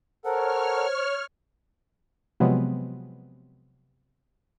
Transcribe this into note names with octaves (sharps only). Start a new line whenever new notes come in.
A4 A#4 C5 C#5 F#5 F6
C3 F3 F#3 G#3 B3